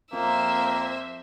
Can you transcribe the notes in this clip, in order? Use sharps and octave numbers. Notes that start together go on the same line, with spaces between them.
F2 A#3 C5 E5